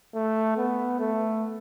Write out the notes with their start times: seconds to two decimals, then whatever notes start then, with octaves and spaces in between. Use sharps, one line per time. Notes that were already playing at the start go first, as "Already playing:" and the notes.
0.15 A3
0.57 B3
1.00 A3